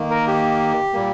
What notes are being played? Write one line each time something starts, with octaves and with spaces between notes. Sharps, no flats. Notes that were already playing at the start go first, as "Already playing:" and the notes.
Already playing: D#3 A#3
A#4
G4
A#2 G3 A#3